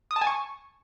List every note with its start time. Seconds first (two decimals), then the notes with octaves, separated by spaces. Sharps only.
0.11 D#6
0.16 A5
0.21 G#5
0.27 C#6